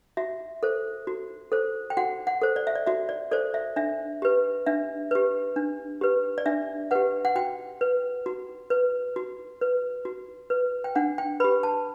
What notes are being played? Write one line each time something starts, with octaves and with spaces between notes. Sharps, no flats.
F#4 E5
A4 C5
F#4
A4 C5
G5
F#4 F#5
F#5
A4 C5
D5
E5
D5
F#4 E5
D5
A4 C5 D5
E5
D4 E5
G4 B4
D4 E5
G4 B4
D4
G4 B4
D5
D4 E5
G4 B4 F#5
F#5
F#4 G5
B4
F#4
B4
F#4
B4
F#4
B4
G5
D4 F#5
G5
G4 B4 B5
A5